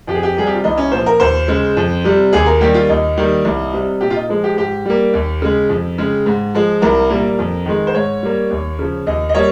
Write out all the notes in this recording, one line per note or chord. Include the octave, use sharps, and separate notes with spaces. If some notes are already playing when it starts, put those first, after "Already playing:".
F2 G4
G#4
G4
C3 G3 G#4
G4
F4
C2 D#4
C#4
A#2 F3 C5
A#4
D#2 C5
C#3 G#3
F2
C3 G3
D#2 G#4
A#4
D#3 G3 A#3 G4
F4
D#2 D#4
D#3 G3 A#3
C2
C3 G3
A#2 G4
F4
D#4
F3 G#3
G4
G#2 G4
G3 A#3
D#2
C#3 G#3
F2
C#3 G#3
G#2
F3 G#3
C2 A#4
A#2 G3 A#3
F2
D#3 G#3
C5
G#2 C#5
G3 A#3
D#2
C#3 F3
D#2 D#5
D#5
G3 A#3 C#5